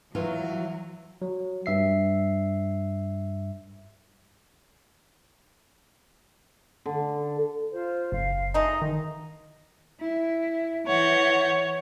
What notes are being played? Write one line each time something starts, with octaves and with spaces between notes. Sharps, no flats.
E3 F#3 F4
F#3
G2 E5 C7
D3
F4 C5
F#1 F5
G#3 A3 D#4 D#5
D#3
E4
E3 C#5 F#5 G6